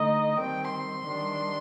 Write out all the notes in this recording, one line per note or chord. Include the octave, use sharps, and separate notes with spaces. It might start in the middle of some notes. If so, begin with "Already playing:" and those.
Already playing: D3 A3 D#4 D#5
D#3 G3 C4 G5
C6
D#3 G3 D4